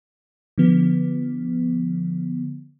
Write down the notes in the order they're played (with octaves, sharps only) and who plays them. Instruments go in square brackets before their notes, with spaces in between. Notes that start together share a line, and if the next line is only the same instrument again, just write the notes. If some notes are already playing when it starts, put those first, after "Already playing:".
[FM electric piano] D3 F3 B3